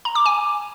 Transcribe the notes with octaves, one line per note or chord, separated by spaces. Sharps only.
A#5
D6
G#5